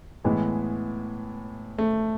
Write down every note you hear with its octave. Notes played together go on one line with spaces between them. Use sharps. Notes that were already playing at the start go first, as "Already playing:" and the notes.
A2 E3 G#3 B3
A3